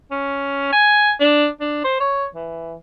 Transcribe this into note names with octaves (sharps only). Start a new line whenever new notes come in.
C#4
G#5
D4
D4
C5
C#5
E3